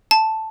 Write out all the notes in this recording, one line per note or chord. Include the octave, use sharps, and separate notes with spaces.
A5